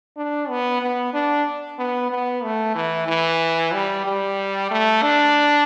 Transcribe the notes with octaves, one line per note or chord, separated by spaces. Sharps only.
D4
B3
B3
D4
B3
B3
A3
E3
E3
G3
G3
A3
D4